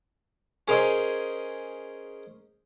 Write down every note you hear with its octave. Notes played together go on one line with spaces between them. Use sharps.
C#4 G#4 A#4 C5 D#5